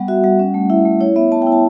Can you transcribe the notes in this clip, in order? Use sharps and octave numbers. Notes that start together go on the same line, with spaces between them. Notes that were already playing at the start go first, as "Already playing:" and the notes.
Already playing: G3 B3 F#5
F#4 E5
G3 F#5
C#4
A3
E4 E5
A3
E4 C#5
B3 E5
B3 A5
G5
E4
A5